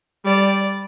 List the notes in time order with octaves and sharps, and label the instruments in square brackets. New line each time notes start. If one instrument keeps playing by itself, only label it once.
[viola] G3 [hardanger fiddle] D5